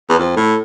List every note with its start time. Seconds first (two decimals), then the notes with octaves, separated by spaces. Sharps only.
0.09 E2
0.19 F2
0.36 A2